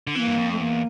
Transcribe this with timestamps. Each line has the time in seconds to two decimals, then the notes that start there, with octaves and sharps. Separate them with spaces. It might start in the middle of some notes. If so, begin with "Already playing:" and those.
0.07 D3
0.15 E3 A#3 C4
0.27 G2
0.37 F2
0.52 A3
0.60 E2 A#3